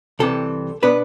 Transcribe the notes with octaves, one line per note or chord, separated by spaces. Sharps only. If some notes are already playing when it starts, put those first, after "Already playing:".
C2 C3 E3 A4
B2 B3 D4 B4